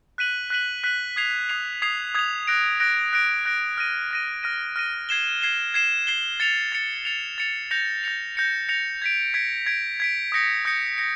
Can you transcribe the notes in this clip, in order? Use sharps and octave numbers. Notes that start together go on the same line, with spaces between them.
F#6 B6 D#7 F#7
F#6 B6 D#7 F#7
F#6 B6 D#7 F#7
D#6 G#6 C7 F7
D#6 G#6 C7 F7
D#6 G#6 C7 F7
D#6 G#6 C7 F7
F#6 A#6 D7
F#6 A#6 D7
F#6 A#6 D7
F#6 A#6 D7
F6 A#6 D#7
F6 A#6 D#7
F6 A#6 D#7
F6 A#6 D#7
G#6 C7 E7 G7
G#6 C7 E7 G7
G#6 C7 E7 G7
G#6 C7 E7 G7
A6 C#7 F7
A6 C#7 F7
A6 C#7 F7
A6 C#7 F7
G6 A#6 C#7 F7
G6 A#6 C#7 F7
G6 A#6 C#7 F7
G6 A#6 C#7 F7
G#6 B6 D7
G#6 B6 D7
G#6 B6 D7
G#6 B6 D7
D#6 G6 A#6 C#7
D#6 G6 A#6 C#7
A#6 C#7